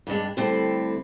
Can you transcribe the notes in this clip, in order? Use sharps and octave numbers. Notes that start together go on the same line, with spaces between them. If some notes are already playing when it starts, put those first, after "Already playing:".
G2 G3 G#3 D4
D3 G3 A3 C4 E4